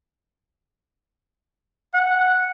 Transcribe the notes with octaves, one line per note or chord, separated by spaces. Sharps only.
F#5